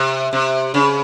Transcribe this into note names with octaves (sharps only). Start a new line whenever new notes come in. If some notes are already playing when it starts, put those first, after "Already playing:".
Already playing: C3
C3
C#3